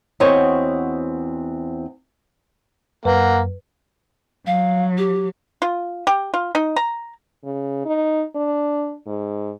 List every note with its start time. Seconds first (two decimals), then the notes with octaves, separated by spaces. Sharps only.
0.20 E2 C4 F#4 C5 C#5 D#5
3.05 F#2 A#3 B4 F#5
4.47 F#3 F5
4.98 G4
5.62 F4
6.07 G4
6.34 F4
6.55 D#4
6.76 A#5
7.44 C#3
7.86 D#4
8.35 D4
9.07 G#2